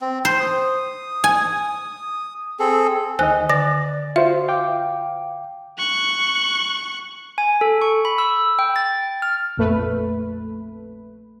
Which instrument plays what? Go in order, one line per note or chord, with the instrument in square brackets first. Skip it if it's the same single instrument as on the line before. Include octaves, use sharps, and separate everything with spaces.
[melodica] C4
[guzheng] C5 [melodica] C6
[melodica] D#6
[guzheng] G#5
[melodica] C4 G#4 A4
[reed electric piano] D2 D#3 D#5 [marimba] C5 G#5 F#6
[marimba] D3 A#6 [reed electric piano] D5 A6
[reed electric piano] F4 F#4 C5 [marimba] E5
[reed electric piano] F5 G5 D6
[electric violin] C#6 F#6
[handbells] G#5
A4
C#6
B5
E6
G5
A6
F6
[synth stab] A#1 F2 A3 B4